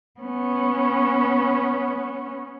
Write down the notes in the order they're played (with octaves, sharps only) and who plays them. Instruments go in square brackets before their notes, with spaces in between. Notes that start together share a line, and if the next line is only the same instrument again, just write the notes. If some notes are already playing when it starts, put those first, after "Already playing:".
[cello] B3 C#4